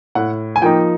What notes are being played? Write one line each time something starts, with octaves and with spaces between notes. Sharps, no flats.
A2 F#5
G#5
F3 A#3 D#4 G5